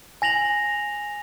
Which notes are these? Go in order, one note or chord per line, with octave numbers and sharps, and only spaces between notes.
G#5 A#6 F7 F#7